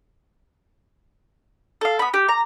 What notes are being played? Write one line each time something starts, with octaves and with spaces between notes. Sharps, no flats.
A4 F5
B3 B5
G4
A#5